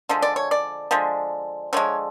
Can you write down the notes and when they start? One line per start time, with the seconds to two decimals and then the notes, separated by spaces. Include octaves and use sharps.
0.09 D3 F3 G#3
0.22 D5
0.36 C#5
0.51 D5
0.91 D3 F3 G#3
1.73 D3 F3 G#3 C#5